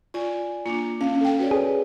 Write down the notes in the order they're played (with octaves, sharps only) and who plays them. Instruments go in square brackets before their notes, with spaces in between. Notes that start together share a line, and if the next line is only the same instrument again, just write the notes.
[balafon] F4 [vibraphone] D5 G#5
[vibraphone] A#3 D4 [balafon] F4
[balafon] C#4 [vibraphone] F5
[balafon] A4 G5
[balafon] F#4 [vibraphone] B4 C#5 D5
[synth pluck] G#4